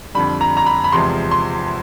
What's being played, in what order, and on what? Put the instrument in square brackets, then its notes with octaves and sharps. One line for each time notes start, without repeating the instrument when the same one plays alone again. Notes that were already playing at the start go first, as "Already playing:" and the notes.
[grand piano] F2 D3 G3 B5
A#5
A#5
B5
B5
E2 C3 F3 G#3 C6
C6